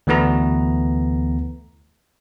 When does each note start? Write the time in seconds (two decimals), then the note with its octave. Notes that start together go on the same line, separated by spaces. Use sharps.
0.07 D2 E3 A3 B3 A#5